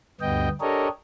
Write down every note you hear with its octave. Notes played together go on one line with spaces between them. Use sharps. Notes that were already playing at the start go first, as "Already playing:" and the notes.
D2 G2 B3 D#5 G5
D4 G4 A4 A#4 C#5 D#5